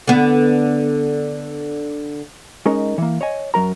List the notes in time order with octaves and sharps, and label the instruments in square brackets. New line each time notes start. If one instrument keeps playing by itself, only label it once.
[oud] D3 B3
[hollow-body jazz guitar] G#3 C#4 D#4 A#4
E3 A#3
C#5 D#5 G#5
F#2 F#3 A#4 A#5